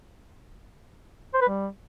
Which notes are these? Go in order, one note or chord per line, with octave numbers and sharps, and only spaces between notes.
C5
B4
G3